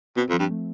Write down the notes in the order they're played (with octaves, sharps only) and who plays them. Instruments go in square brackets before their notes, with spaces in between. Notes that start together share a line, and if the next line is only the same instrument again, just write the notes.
[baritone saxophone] B2 [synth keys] C4
[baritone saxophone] F2 [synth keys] F3
[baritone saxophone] G2
[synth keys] A3